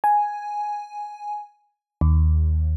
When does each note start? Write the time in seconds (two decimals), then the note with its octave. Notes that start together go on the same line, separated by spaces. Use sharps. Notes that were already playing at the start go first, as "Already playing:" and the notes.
0.04 G#5
2.01 D#2